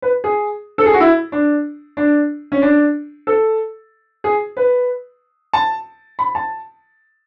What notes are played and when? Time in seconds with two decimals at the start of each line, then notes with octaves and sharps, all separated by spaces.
0.02 B4
0.24 G#4
0.78 A4
0.86 G#4
0.93 F#4
1.00 E4
1.32 D4
1.97 D4
2.52 C#4
2.62 D4
3.27 A4
4.24 G#4
4.57 B4
5.53 A5
6.19 B5
6.35 A5